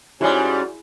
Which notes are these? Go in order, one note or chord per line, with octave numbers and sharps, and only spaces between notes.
G#2 G3 C#4 E4 F#4 G#4 C6